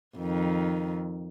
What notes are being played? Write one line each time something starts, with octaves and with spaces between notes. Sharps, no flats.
F2 D#3